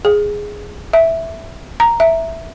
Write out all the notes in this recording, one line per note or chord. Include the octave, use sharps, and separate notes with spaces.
G#4
E5
A#5
E5